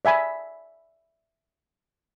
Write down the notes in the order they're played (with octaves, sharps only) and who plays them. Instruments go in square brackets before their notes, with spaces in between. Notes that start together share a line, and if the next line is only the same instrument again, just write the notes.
[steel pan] D5 E5 G#5 B5